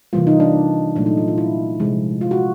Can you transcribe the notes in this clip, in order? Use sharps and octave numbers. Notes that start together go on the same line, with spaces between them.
C3 E3 G3 A#3 F4
D#4
D4
A#2 F#3 A3 D4
D#4
F4
F4
E4
C3 F3 G#3
F4
F#4